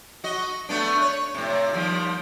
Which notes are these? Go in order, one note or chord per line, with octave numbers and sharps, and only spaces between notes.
F#4 D#5
A3 B3 D4
C#5
A2 C3
D#2 F3 G3